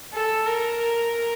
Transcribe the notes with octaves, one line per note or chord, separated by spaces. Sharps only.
A4
A#4